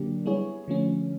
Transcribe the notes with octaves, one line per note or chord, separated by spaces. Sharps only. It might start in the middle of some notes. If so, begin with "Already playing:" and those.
Already playing: D3 F#3 A#3 D4 G4
G3 B3 E4 G#4 C#5
D3 F3 A3 C#4